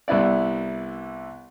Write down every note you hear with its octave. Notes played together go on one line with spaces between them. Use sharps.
C2 B3 E4 D5